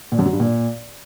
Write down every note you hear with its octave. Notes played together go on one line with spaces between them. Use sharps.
A#2
F#2
F#3
G2
A#2